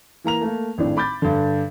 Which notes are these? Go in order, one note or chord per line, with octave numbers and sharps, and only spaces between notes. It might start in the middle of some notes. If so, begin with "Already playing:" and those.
E3 A#3 A#5 F7
A3 A#3
G#1 A2 D4
B5 D6 G6 A6
G2 D3